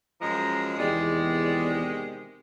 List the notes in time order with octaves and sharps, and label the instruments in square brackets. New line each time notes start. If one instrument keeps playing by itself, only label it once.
[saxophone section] F#2 F3 G#3 [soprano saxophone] A#5
[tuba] E2 [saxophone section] C3 D#3 G#3 [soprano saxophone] D5